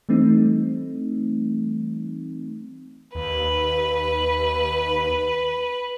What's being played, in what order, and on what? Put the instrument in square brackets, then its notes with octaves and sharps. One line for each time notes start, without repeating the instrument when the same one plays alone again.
[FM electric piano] E3 G3 A3 C4 D#4
[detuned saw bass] D#2 [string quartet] B4